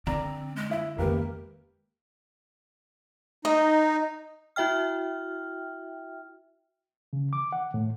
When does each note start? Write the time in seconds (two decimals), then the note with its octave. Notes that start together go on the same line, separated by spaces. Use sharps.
0.07 D3 C4 D4 D5 A#5
0.56 G#3
0.71 E4 E5
0.98 F2 D#3 G#3 A#3 G4 A#4 B4
3.45 D#4 D#5
4.56 E4 F#4 E5 G5 F6
7.13 C#3
7.33 D6
7.52 F#5
7.74 A2